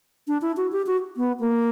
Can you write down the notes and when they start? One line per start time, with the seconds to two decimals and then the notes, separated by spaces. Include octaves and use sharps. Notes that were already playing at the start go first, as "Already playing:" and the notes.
0.28 D4
0.42 E4
0.57 F#4
0.72 G4
0.86 F#4
1.17 B3
1.40 A#3